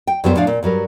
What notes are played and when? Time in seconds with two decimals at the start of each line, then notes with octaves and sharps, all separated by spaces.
0.07 G5
0.24 F#2 F#3 G3 B3 G#4 C5
0.36 A2 F3 D4 F5
0.47 A#2
0.63 G2 F#3 G3 A#4